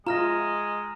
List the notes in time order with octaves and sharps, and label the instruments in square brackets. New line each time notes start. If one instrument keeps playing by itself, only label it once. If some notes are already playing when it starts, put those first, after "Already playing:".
[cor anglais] G#3 [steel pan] F4 E5 [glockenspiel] A#5 F6 A#6